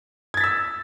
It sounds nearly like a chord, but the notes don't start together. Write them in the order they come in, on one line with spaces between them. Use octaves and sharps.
G#6 A6 B6 E6